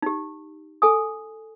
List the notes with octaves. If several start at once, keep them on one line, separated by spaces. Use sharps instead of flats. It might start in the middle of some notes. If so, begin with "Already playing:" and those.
D#4 G4
A4 G#5 D#6